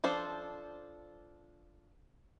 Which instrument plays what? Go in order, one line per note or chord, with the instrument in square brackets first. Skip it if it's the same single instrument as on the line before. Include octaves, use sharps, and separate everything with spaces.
[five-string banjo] F3 D4 A4 C5